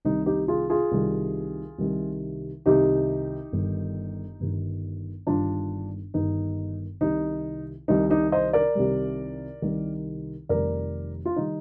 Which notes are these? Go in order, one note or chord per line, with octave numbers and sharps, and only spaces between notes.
C2 C3 D#3 G3 D#4
D#4 G4
F4 G#4
F4 G#4
C2 C3 D#3 G3
C2 C3 D#3 G3
C2 C3 D#3 G3 D#4 G4
G1 G2 D#3
G1 G2 D#3
G1 G2 D#3 D4 F4
G1 G2 D#3 D#4
C2 C3 D#3 G3 D#4
C2 C3 D#3 G3 D#4
D#4 G4
C5 D#5
A#4 D5
C2 C3 D#3 G3
C2 C3 D#3 G3
F1 F2 D#3 G3 A#4 D5
F4
D#3 G3 D#4